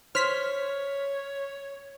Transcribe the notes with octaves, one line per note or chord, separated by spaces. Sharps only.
C5 C#5 F6 B6